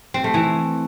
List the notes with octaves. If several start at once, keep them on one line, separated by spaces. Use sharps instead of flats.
C4
A3
E3